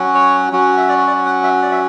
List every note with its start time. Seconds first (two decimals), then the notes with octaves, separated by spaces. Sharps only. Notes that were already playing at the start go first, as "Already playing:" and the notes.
Already playing: F#3 C#4 F#4
0.15 C#5
0.52 F#3 C#4 F#4
0.78 E5
0.89 D5
1.07 D5
1.25 F#5
1.44 E5
1.62 D5
1.71 E5